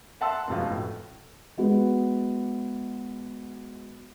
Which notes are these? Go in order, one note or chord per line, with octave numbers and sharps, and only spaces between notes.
E5 F#5 A5 C6 E6
F1 B2 F3
A2
G#3 B3 F#4